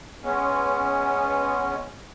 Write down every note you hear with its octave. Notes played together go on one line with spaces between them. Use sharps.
G#3 B3 C#4